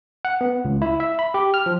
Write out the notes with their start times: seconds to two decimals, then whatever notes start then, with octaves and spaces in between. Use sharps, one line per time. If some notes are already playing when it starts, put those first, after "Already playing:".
0.25 F#5
0.41 B3
0.65 C#2
0.82 E4
1.00 E5
1.19 B5
1.34 G4
1.54 F6
1.66 F3